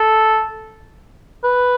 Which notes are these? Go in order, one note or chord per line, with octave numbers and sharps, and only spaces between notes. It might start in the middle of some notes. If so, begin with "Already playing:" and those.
Already playing: A4
B4